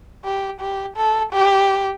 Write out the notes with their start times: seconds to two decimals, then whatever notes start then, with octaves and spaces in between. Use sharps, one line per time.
0.25 G4
0.61 G4
0.97 A4
1.33 G4